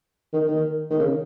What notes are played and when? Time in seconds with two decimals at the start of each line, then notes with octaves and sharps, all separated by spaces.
0.33 D#3
0.47 D#3
0.90 D#3
0.99 C#3